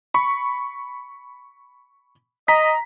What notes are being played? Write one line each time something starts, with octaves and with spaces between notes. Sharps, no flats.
B5 C#6
D#5 A#5 B6